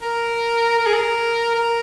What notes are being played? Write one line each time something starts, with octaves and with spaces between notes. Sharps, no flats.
A#4
A#4
G#4
A#4
A#4